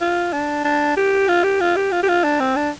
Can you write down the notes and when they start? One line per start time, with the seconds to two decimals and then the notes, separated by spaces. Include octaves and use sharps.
0.01 F4
0.33 D4
0.64 D4
0.97 G4
1.28 F4
1.44 G4
1.61 F4
1.76 G4
1.92 F4
2.03 G4
2.08 F4
2.24 D4
2.40 C4
2.56 D4